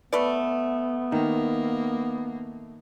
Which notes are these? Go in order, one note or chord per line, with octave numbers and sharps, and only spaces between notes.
A3 B3 B4 D5
D#3 A#3